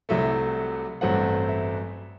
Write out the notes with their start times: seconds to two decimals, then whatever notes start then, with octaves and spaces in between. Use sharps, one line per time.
0.09 C2 C3 F#3 A3 E5
1.01 A1 G2 F#3 A3 C4 F#5
1.48 E5